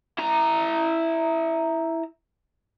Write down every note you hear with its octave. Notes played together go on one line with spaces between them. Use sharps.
E4 A#5